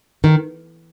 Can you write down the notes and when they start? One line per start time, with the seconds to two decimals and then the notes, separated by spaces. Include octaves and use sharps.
0.24 D#3